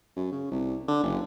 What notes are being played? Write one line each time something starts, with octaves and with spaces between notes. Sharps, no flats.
F#2
C#3
C2
D3
F#1